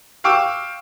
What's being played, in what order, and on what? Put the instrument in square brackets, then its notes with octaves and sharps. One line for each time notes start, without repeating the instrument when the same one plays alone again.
[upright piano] F5 G5 C#6 D6 E6